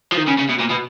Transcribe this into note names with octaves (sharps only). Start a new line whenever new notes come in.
F3
D#3
C#3
C#3
B2
A#2
B2